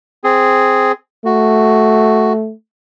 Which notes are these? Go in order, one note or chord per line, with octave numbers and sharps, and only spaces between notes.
C4 G#4
A3 F#4